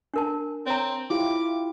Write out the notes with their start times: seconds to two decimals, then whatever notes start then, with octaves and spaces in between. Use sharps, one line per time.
0.14 D4 A#4 A5
0.66 C4 C#5 A#5
1.10 E4 F4 G4 D6